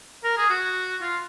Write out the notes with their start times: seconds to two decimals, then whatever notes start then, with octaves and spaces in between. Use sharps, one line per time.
0.23 A#4
0.37 G#4
0.49 F#4
1.01 F4